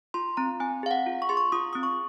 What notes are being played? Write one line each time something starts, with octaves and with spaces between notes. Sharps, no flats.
F4 C6
C4 A#5
C4 G#5
G#4 F5
F#5
F4
C#6
G#4 C6
C#6
F4 D#6
C4 D#6
C#6